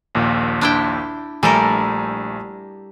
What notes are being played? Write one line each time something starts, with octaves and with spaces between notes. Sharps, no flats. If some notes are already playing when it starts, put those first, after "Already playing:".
A#1 D#2 A#2
D4 E4 G5
A#1 G3 A3 A4 A#4 G#5